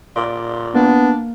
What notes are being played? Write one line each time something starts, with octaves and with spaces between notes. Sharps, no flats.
A#2 D5
A#3 B3 D4